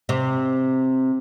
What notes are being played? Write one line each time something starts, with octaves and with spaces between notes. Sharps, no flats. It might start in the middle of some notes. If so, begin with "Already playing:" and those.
C3